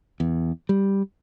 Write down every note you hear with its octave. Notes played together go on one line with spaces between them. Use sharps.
E2
G3